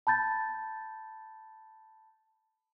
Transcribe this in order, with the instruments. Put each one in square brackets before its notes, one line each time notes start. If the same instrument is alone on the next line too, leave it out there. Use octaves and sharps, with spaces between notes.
[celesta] A5 B5 G6 A6